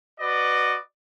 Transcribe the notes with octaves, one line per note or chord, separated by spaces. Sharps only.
F#4 B4 D5 D#5